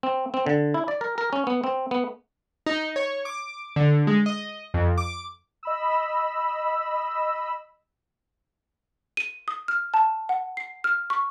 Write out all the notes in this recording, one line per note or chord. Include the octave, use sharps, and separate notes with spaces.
C4
C4
D3
E4
D5
A#4
A#4
C#4
B3
C4
B3
D#4
C#5
D6
D3
G#3
D#5
F2
D6
D#5 B5 E6
D#7
D#6
F6
A5
F#5
C7
F6
C#6